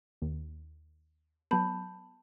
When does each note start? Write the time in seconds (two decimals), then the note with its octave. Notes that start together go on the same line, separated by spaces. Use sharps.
0.22 D#2
1.51 F#3 B3 A5 B5 G6